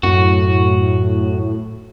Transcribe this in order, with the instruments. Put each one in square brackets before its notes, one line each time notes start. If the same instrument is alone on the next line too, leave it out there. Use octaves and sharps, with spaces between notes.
[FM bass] F#2 [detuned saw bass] A2 [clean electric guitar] F#4